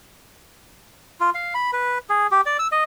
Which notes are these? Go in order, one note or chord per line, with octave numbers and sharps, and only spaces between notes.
F4
F5
B5
B4
G#4
G4
D5
E6
D#5